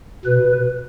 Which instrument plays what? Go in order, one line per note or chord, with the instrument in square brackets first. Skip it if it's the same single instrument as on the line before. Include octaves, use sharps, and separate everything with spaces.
[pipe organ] B2 B4